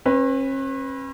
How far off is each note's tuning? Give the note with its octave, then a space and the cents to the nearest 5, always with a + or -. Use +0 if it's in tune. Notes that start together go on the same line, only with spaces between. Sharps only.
C#4 -45 B4 +0